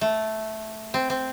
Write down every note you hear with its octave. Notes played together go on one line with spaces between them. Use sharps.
A3
C4
C4